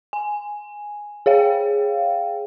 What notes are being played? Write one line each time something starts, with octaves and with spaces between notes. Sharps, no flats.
G#5
G#4 C#5 F5 G5